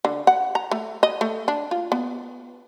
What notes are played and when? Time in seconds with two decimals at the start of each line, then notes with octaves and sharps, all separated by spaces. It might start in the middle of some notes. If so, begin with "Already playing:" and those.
0.05 D3
0.27 F#5
0.55 A#5
0.71 A3
1.03 D#5
1.21 A3
1.48 D4
1.71 F4
1.92 B3